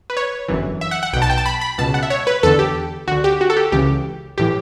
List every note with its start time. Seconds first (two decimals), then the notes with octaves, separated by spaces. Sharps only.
0.10 B4
0.17 C#5
0.48 G1 F#2 E3
0.81 E5
0.91 F#5
1.03 F#5
1.13 B1 G5
1.16 B2
1.22 A5
1.30 G5
1.38 A5
1.46 B5
1.61 B5
1.78 C#2 B2 A5
1.94 F#5
2.03 E5
2.10 C#5
2.27 B4
2.43 E2 D3 A4
2.59 G4
3.08 D2 D3 F#4
3.24 G4
3.41 F#4
3.50 A4
3.57 G4
3.72 C#2 C#3 E3 G4
4.38 A2 E3 G4